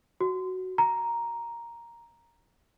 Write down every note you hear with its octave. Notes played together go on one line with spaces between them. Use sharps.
F#4
A#5